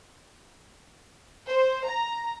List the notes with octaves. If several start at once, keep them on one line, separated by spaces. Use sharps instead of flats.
C5
A#5